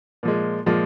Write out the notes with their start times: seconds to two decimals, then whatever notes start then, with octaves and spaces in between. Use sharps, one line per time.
0.23 A#2 F3 G#3
0.66 A#2 F3 G#3